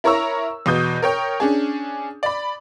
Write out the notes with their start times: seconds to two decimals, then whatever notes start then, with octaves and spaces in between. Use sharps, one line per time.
0.04 E4 A#4 C#5 A#5 C#6 E6
0.66 E2 B2 D#6 G6
1.02 A#4 C#5 G5
1.40 C#4 D4 G#4
2.23 D5 B5